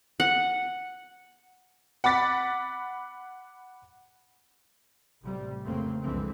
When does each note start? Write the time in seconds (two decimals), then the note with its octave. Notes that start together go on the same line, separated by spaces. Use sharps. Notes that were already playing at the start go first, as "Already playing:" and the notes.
0.20 F#5
2.04 F#5 B5 D6 A6 B6
5.21 A1 C3 G3
5.64 F1 C#3 A3 A#3 C4
6.01 C2 F2 D3 E3 G#3 C4